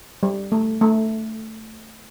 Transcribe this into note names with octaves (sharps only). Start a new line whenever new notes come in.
G3
A3
A3